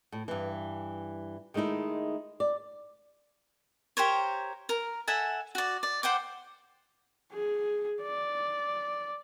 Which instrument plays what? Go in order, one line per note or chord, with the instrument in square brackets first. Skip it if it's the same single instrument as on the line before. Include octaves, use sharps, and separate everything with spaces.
[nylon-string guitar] A2
G2 E3
D#3 G#3 A3 D#4 E4
D5
[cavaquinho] G4 A#4 C5 C#5
A#4
A4 E5 F#5 G#5
F#4 D5
D5
C5 F#5 G5 D6
[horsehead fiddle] G#4
D5